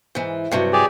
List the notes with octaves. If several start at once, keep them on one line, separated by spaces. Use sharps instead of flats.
G#2 E3
G2 C3 F#3
G4 G#4 D5